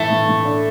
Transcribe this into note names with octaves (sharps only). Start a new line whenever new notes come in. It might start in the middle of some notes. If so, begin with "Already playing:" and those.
Already playing: A2 E3 A3
A2
A2
D4